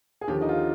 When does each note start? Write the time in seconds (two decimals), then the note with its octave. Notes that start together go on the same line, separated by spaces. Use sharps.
0.21 G#4
0.28 D#2 D3 F3 G4
0.41 D#4
0.49 F4